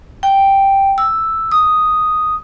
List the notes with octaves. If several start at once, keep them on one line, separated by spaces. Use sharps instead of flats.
G5
E6
D#6